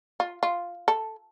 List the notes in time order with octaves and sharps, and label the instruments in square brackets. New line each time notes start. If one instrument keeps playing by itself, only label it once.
[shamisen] F4
F4
A4